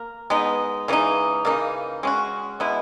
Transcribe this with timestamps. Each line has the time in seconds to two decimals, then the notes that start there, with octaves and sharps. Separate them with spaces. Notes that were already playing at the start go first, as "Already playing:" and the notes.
Already playing: A#3 A#4
0.30 G#3 B3 D#4
0.88 C#3 E3 G#3 D#4
1.45 C#3 E3 A#3 D#4
2.03 G#3 C#4 F#4
2.60 B2 G#3 B3 E4